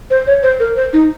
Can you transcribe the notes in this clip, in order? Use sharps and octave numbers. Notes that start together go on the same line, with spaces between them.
C5
C#5
C5
A#4
C5
D#4